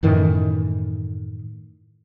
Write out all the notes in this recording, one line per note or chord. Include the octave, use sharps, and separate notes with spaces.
F#2 A2 D#3 E3